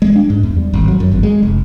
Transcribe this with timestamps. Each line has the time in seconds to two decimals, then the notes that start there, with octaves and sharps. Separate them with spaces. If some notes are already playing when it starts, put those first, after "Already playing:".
0.02 G#3
0.15 D4
0.30 G#2
0.43 E2
0.56 G3
0.73 G#1
0.88 F#3
1.00 F#2
1.12 G#1
1.23 G#3
1.43 F1